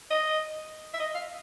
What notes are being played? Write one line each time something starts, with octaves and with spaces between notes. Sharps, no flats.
D#5
E5
D#5
F5